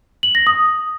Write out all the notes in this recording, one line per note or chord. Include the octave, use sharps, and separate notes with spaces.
F#7
A#6
D#6